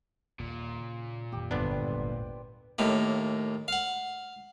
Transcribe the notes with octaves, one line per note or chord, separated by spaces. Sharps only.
D#1 D#2 A#2
C#3
F2 D#3 A#3 G4
G1 B3 D4 B4 C5 D5
D#1 G#1 G#3 G5
D#2 A2 A#3
F5 F#5